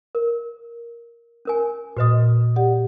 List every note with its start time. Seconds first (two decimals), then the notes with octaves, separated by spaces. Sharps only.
0.15 A#4
1.45 C#4 A#4 G#5
1.97 A#2 F#4 B4 D#5 D#6
2.56 G4 D5 F#5